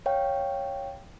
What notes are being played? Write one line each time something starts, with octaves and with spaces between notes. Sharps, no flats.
C#5 F5 G5